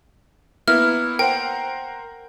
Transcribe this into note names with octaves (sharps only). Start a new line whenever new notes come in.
A#3 B3 E4 F6
A#4 C5 F#5 G5